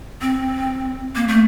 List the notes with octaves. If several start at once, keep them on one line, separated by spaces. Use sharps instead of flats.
C4
A#3
A3